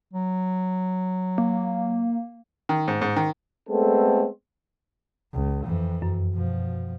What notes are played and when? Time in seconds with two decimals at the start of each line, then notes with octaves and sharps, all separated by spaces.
0.13 F#3
1.38 A#3
2.69 D#3
2.88 G#2
3.01 G#2
3.16 D#3
3.68 G#3 A3 B3 C4 A4
5.33 C#2
5.64 F2 E3
6.02 F#2
6.35 B2 F3